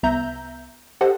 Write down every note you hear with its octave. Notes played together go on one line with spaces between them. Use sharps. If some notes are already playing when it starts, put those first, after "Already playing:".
C2 B3 E5 A#5 G6
G4 A4 C5 D#5 F#5